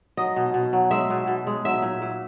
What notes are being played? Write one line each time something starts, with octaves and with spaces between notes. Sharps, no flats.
F#3 D#5
B2
B2
F#3
G#3 E5
B2
B2
G#3
F#3 E5
A#2
A#2